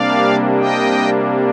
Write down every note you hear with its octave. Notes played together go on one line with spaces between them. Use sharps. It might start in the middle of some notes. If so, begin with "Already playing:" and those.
Already playing: C3 G3 A#3 D4 D5 F5
D#5 G5